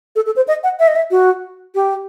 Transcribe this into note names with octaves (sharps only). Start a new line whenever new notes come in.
A4
A4
C5
D#5
F#5
E5
D#5
E5
F#4
G4